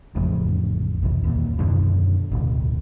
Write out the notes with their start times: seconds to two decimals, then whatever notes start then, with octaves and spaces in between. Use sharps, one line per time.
0.15 A1 F2 A2 C#3
1.03 B1 E2
1.24 D#2 A#2
1.59 F#2 B2 D3 D#3
2.31 E1 A1 D2